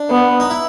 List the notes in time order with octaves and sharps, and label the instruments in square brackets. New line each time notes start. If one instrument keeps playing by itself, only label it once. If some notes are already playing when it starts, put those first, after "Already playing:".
Already playing: [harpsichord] D4
[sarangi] B3
[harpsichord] D#4
E4